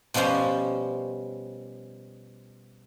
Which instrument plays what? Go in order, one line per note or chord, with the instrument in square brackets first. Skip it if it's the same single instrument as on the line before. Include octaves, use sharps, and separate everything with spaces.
[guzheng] B2 F3 G3 C#4 C5